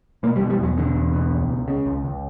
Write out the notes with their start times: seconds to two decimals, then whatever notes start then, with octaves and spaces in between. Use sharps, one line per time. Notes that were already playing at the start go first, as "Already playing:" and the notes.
0.23 B2 A#3
0.36 G3
0.41 B2
0.50 G3
0.59 E2 F#3
0.77 B2 D3
0.96 E2
1.13 B2
1.31 C#2
1.49 C#2
1.68 C#3
1.86 C#2
2.04 C#2